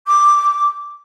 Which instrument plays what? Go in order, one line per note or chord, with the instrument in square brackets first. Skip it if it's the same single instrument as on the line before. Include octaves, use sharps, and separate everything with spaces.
[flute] D6